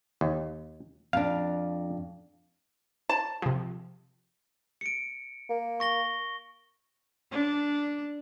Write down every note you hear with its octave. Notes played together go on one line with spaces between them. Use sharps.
D#2
F2 D4 F5
A5
C3 F3
C#7 D7
A#3
C#6 A#6 G7
D4